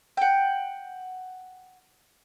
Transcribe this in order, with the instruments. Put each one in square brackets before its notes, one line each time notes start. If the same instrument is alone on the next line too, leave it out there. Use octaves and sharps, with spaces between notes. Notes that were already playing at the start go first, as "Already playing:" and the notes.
[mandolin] F#5 G5